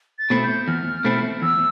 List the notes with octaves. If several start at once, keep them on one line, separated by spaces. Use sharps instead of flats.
A6
B2 A3 C4 E4
G6
E2 F6
B2 A3 C4 E4
E2 E6